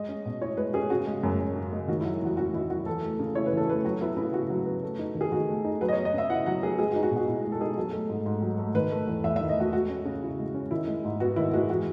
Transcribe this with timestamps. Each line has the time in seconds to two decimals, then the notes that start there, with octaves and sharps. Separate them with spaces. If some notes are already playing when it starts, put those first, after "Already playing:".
Already playing: G#3 D#5
0.09 C#4
0.26 B2
0.41 E4 C#5
0.57 G#3 B4
0.74 C#4 G#4
0.90 C#3 F#4
1.06 G#3
1.23 F#2
1.40 F#2
1.56 C#3
1.73 G#3
1.88 D#3 F#4
2.01 E4
2.05 F#3
2.22 E2 F#4
2.37 C#4 F#4
2.53 D#3 E4
2.70 F#3 F#4
2.86 E3 A4
3.03 A3
3.19 C#3
3.35 E4 C#5
3.46 B4
3.52 E3
3.57 A4
3.68 A3 B4
3.85 F#3 F#4
4.01 B3 E4
4.17 C#3 E4
4.34 E4 F#4
4.50 F#3
4.66 B3
4.83 A3
4.99 D#4
5.15 D#3
5.21 G#4
5.32 D#3 F#4
5.49 A3
5.65 D#4
5.81 F#3 B4
5.88 D#5
5.93 C#5
5.97 B3
6.05 D#5
6.13 C#3 E5
6.30 E4 F#5
6.46 F#3 F#5
6.62 B3 G#4
6.79 G#3 G#4
6.92 F#4
6.96 D#4
7.03 F#4
7.11 B2
7.16 F#4
7.28 B2 E4
7.45 G#3
7.52 A4
7.61 D#4 G#4
7.78 F#3 A4
7.93 A3
8.09 G#2
8.26 G#2
8.42 F#3
8.58 A3
8.74 D#3 B4
8.91 A3
9.07 E2
9.24 E2 E5
9.36 E5
9.41 D#3
9.49 D#5
9.57 A3 F#4
9.73 G#3 F#4
9.89 C#4
10.05 C#3
10.23 E4
10.39 G#3
10.54 C#4
10.71 D#3 E4
10.88 G#3
11.04 G#2
11.20 B3 F#4
11.36 D#3 E4
11.53 G#3 F#4
11.70 E3 F#4